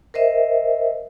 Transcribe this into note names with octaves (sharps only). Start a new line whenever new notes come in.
A#4 C5 D#5 E5